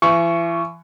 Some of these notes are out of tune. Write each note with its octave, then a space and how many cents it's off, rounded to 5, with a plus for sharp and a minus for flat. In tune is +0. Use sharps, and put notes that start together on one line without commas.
E3 +35 C#6 +0